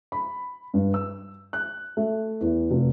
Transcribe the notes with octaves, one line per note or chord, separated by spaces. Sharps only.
B5
G2
E6
F#6
A3
E2
F1